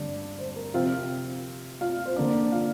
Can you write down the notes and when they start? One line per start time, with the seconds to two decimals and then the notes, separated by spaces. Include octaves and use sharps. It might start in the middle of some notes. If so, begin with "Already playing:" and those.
Already playing: G2 D3 C4 D4 D5
0.39 C5
0.56 A#4
0.74 C3 F3 C4 F4 F5
1.81 F4 F5
2.06 C5
2.16 D3 A#3 D4 D5
2.52 F4 F5